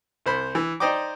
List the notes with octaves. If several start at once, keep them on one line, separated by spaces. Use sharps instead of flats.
C2 C5 B5
E3
D#4 C5 D5 D#5 G5 D6